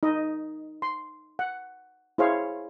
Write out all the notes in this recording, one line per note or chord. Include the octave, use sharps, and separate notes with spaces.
D#4 D#5
C6
F#5
E4 G#4 C5 C#5 F5